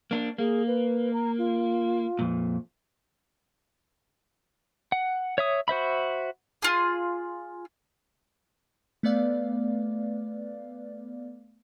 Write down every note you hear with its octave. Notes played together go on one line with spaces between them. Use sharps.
A#3 D4
A#3 G#4
B4
A#5
F4
F2 A#2
F#5
C#5 E5 D#6
F#4 C5 E5 B5
F4 G#4
A3 B3 B4 D5 F5